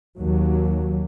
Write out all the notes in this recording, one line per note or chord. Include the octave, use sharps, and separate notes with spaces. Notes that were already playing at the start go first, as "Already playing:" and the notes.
D#2 F#3